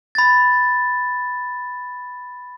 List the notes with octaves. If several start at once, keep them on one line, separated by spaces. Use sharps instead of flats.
B5 A6